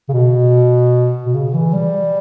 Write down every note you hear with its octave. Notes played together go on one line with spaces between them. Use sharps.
C#3
B2
B2
C#3
E3
G3